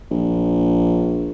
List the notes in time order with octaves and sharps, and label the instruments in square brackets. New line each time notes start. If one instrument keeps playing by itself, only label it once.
[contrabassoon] A#1